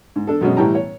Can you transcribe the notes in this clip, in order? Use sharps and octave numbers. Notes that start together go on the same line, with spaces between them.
G#2
D4 A4
F#2 B2 G#3 C#4
A2 E3 G3 G5 A5 A#5
C#5